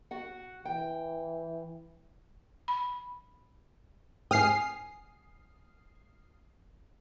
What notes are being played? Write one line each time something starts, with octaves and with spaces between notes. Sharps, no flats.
F#4 F#5
E3 G5
B5
G5 G#5 D#6 F6 C7